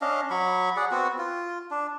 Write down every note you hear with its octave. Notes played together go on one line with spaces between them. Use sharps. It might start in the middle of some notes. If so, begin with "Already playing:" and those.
C#4 D4 D#5 F5
F#3 B5 C#6
G#4 D5 F#5
B3 C4 F#4
F4
D4